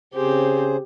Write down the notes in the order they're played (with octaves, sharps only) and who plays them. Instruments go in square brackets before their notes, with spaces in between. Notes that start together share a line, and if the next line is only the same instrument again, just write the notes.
[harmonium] C#3 G#4 C5 [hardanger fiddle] C4 G4